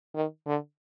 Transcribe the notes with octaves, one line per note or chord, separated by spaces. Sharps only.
D#3
D3